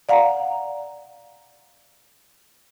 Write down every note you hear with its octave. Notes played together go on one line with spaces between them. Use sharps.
D5 F5 F#5 A#5